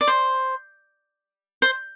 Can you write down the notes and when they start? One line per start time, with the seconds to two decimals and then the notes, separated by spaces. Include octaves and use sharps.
0.01 D5
0.07 C5
1.62 C5